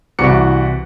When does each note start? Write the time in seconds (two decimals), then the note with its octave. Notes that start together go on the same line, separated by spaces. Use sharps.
0.19 C2 E3 F#4 D6 C#7